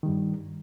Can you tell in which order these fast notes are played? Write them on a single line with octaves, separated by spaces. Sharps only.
D#3 G3 G2